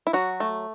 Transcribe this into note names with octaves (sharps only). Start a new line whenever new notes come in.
E4
F#3 F#4
A3